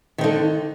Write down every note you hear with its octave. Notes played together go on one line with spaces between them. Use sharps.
D3 D#3 D#4